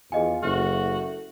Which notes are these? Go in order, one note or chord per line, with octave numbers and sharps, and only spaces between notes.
E2 F4 G#4 D#5 G#5
F#1 A3 F#4 F6